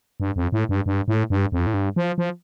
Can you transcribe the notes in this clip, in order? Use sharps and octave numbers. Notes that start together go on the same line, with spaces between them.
G2
F2
A2
G2
G2
A2
G2
F2
A2
G2
F3
F3